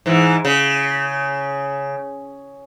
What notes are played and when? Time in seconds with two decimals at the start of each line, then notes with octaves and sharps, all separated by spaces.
0.06 G#2 E3
0.45 C#3